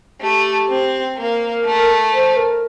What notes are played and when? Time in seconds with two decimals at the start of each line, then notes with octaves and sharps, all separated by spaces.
0.20 A3 G4
0.69 C4
1.17 A#3 A#4
1.65 A3
2.13 C5
2.37 A#4